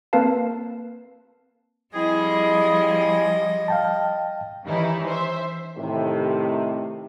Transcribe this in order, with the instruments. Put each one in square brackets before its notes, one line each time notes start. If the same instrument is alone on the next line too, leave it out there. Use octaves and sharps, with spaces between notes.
[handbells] A#3 C4 A#4 B4 F5 A5
[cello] F3 G3 [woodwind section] C4 E4 G#4 [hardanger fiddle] D#5
[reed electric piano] F5 G5 A5
[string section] D#3 E3 G3 C#4 D#4 E4
C5 E5
[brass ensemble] A2 C3 D#3